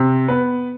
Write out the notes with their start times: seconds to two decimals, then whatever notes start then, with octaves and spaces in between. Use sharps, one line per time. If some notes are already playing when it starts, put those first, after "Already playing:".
Already playing: C3
0.28 B3 B4